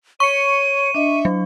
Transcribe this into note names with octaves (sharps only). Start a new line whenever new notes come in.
C#5 C#6 C#7 D#7
D4 D#5 E5
F#3